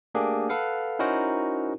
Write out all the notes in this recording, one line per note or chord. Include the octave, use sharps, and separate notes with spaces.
A3 A#3 D4 G4 G#4
A4 B4 F5 F#5
C#4 D#4 E4 F#4 A#4 C5